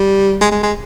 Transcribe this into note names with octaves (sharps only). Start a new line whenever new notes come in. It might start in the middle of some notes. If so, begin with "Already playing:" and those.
Already playing: G3
G#3
G#3
G#3